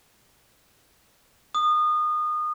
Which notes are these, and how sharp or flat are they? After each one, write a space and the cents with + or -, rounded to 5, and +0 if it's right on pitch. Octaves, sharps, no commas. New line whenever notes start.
D#6 -25